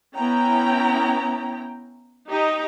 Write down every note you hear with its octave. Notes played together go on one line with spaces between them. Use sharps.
B3 C#4 E4 G5 A#5
D#4 G4 D#5 A#5